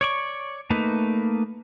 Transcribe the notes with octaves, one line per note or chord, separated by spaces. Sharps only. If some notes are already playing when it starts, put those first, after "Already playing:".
C#5 D5 C#6
A3 A#3 D#4 B4